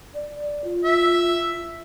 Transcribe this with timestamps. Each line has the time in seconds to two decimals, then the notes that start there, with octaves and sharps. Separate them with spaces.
0.14 D5
0.64 F4
0.84 E5